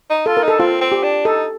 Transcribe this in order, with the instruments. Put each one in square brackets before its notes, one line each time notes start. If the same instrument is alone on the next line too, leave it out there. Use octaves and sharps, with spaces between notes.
[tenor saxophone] D#4
[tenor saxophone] F4 [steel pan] A4
[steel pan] A#4
[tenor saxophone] D#4 [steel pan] A4
[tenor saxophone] C4 [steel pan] F4
[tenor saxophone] C4
[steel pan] G4
[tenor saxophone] D4
[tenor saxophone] D#4 [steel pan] A4